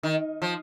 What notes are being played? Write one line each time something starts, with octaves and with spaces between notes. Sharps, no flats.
D#3
F3